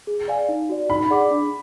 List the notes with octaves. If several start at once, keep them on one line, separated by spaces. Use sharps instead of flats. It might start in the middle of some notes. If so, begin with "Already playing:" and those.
G#4
D5 F5 G#5
D#4
F#4 D5
D#4 B5
G#4 D5 F#5 D6
D4